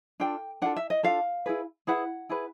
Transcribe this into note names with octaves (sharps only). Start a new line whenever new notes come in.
D4 F4 A4 G5
D4 F4 A4 F#5
E5
D#5
D4 F4 A4 F5
E4 G#4 B4
E4 G#4 B4 F#5
E4 G#4 B4